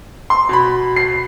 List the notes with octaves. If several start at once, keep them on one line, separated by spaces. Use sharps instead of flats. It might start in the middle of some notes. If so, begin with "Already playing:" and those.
C6
B2 B5
C7